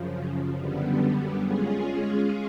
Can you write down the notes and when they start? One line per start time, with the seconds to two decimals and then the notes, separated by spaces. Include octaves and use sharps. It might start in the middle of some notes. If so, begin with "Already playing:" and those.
Already playing: F#2 C#3 F3
0.55 F#2 D3 G3 B3
1.39 G#3 C#4 F4 G#4